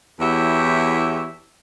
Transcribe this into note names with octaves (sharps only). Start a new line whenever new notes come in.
E2 E4 F#4 G4 C#5 E5